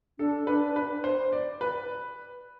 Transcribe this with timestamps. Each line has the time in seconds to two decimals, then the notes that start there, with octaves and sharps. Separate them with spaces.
0.18 D4 A4
0.47 D4 B4
0.76 B4
1.04 C5
1.33 D5
1.61 B4